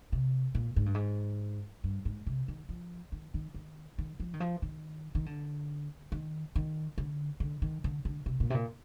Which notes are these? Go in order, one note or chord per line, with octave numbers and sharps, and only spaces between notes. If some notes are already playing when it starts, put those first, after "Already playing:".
C3
A#2
G#2
G2
G#2
G2
G#2
C3
D#3
F3
D#3
D#3
D#3
D#3
F3
D#3
F3
D#3
D#3
D3
D#3
D#3
D3
D3
D#3
D3
D3
C3
A#2
C3
A#2